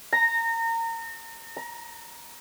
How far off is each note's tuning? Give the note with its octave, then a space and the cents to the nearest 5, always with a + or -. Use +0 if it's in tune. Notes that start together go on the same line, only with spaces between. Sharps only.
A#5 -30
A#5 +25